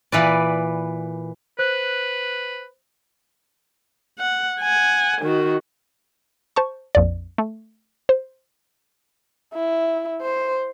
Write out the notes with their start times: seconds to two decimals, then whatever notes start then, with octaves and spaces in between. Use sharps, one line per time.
0.12 A#2 E3 B4 D5
1.59 B4 C5 F#6
4.19 F#5
4.61 F#5 G#5
5.21 D#3 F#4
6.56 C5 A5 C#6
6.95 A#1 F2 D5
7.38 A3
8.09 C5
9.54 E4
10.22 C5